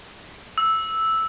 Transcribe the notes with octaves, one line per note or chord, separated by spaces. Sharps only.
E6